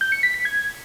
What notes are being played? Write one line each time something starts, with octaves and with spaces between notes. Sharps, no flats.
G6
C#7
B6
B6
G#6